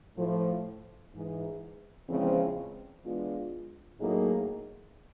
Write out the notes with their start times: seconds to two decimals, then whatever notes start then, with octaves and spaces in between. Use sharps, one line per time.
0.17 A2 F3 A3
1.13 G#2 E3 G#3
2.08 E2 C#3 F3 G#3 C4
3.04 E3 G#3 B3 D4 F4
3.99 A2 F#3 A#3 D#4 G#4